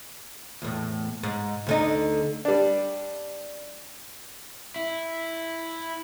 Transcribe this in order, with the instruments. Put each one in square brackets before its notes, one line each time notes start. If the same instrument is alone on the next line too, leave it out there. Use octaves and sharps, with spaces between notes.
[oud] E2 A2
G#2
D2 D3 D#4
[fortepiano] G3 D4
[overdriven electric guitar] E4